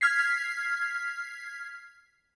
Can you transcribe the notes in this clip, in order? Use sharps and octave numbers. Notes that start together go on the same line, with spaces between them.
F6 G#6 B6 C7